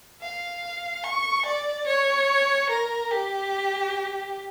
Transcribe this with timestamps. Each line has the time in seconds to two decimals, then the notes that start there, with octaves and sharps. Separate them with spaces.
0.22 F5
1.04 C#6
1.46 D5
1.87 C#5
2.70 A#4
3.11 G4